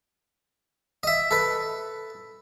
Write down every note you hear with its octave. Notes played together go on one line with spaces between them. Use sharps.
D#5 E5
A4 B4